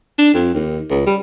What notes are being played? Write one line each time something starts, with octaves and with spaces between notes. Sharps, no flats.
D4
F2
D#2
C#2
G3